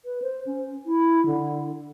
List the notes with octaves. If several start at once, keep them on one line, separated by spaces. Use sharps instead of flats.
B4
C5
C#4
E4
D3